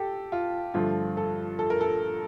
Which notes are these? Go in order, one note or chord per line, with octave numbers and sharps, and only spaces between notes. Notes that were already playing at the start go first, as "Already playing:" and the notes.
Already playing: G4 A4
F4
G2 D3 F3 A3 F4
A4
A4
A#4
A4